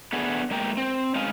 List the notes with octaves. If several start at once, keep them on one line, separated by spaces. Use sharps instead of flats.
A3 B3 D4 G#4
G#3 A#3 A#4 G5
C4
G#3 C#4 D#4 G#4 F5 G#5